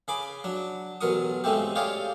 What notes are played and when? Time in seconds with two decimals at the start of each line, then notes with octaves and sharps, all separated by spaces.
0.08 C#3 G#4 B5 D6
0.44 F#3 D4
1.01 A1 B2 F#3 A#4 C#6 D#6
1.44 G#2 C#3 G#3 A3 C4 G4
1.75 F4 G4 G#4 C#5 D5 F5